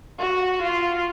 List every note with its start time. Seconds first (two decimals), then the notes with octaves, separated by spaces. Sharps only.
0.19 F#4
0.62 F4